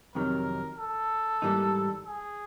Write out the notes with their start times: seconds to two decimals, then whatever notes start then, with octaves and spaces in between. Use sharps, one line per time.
0.15 F2 C3 D#3 F#3 A#4
0.79 A4
1.42 G#2 E3 G3 A#3 D#4
2.07 G#4